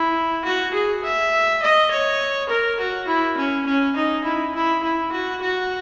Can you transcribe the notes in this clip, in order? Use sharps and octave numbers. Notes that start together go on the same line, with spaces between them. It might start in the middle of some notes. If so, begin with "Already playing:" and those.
Already playing: E4
F#4
G#4
E5
D#5
C#5
A#4
F#4
E4
C#4
C#4
D#4
E4
E4
E4
F#4
F#4